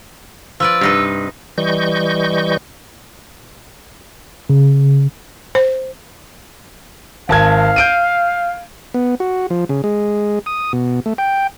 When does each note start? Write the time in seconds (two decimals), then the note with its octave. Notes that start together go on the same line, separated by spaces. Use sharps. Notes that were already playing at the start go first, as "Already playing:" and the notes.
0.60 F3 B4 D5 E6
0.81 G2 C3 D#4 B4
1.58 E3 G3 D#5 C#6 G6
4.50 C#3
5.55 C5
7.29 G#1 F5 A5 G#6
7.76 G6 D7 D#7
8.94 B3
9.20 F#4
9.50 F3
9.69 C#3
9.84 G#3
10.46 D#6
10.73 B2
11.06 A3
11.18 G5